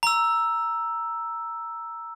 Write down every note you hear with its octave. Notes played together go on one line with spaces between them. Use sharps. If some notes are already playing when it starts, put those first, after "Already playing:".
A#5 E6